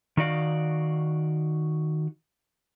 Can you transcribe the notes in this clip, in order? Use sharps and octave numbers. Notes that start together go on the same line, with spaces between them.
D#3 D#4 F#4 D5 F5